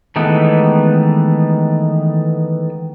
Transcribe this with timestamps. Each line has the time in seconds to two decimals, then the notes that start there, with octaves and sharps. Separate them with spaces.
0.16 D#3 E3 G#3 A3 B3